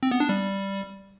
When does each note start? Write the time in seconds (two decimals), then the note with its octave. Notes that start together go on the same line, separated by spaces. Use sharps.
0.03 C4
0.11 B3
0.20 D4
0.29 G3